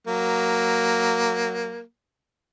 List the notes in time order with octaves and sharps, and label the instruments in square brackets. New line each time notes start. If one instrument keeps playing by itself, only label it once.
[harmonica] F#3 A#3